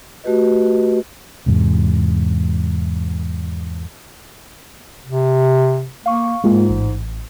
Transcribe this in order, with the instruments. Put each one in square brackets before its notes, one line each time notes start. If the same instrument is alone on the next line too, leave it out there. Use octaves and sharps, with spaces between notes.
[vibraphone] A3 F#4 G4 B4 D#5
[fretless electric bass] E2 G#2 C3
[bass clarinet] C3
[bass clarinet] A#3 [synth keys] F5 C#6
[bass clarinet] G#2 [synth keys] G#3 A#3 F4
[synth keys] A1